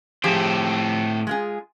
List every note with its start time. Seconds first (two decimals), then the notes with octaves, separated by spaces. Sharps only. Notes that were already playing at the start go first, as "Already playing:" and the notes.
0.24 A2 F3 C4 G4 G#4
1.27 G#3 F4 G#4